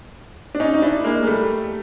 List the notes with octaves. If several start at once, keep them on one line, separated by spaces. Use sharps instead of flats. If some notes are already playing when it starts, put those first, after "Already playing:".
D4
C#4 D#4
D#4
D4 E4
G#3 A#3
G#3
G3 A3